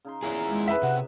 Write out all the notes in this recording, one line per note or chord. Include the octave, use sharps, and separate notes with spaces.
C#3 D#4 C6
A#2 E4 G#4 C#5 A#5
A#2 G#3
B4 E5
C3 F#5